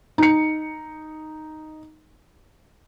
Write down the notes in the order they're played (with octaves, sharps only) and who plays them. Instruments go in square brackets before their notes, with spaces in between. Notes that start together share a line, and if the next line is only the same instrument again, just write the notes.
[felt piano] D#4 C#7